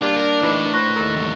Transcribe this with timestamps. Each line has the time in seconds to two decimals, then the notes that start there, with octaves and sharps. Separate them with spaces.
0.02 G3 A#3 D4 F4
0.16 A#4 A5
0.42 A2 E3 D#4 B4
0.74 B4 C5 C#6 F#6 A#6
0.96 D#2 A4 A#4
1.16 E2 G#2